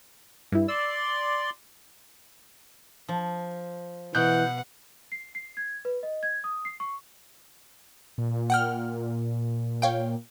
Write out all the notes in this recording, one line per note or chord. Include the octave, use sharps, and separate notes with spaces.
G2 E4
D5 C6 E6
F3
B2 E3 F#5 F#6 G6
C7
C7
G#6
B4
D#5
G#6
D#6
C7
C#6
A#2
F#5 G5 F6
C#5 F5 G5